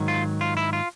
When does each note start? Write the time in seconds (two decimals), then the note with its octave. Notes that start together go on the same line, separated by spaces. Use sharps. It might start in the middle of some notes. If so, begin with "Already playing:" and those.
Already playing: G#2 D#3 F#3
0.08 F4
0.41 F4
0.57 E4
0.73 F4